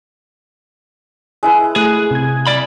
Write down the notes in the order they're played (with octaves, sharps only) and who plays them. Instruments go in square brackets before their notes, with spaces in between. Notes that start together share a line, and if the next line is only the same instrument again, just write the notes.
[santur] G#3 E4 B4
[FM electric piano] A3 F#6 [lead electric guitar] G#4
[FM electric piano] C3 G#6
[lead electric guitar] D5 B5